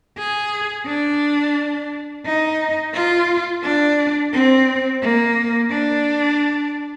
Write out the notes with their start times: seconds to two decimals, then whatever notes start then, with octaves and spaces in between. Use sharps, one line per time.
0.18 G#4
0.87 D4
2.26 D#4
2.94 F4
3.63 D4
4.33 C4
5.02 A#3
5.71 D4